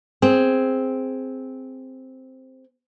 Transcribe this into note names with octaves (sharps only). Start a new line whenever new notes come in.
C4 G#4